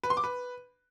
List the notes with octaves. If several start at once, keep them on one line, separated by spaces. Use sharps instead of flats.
B4
C6
D6
B4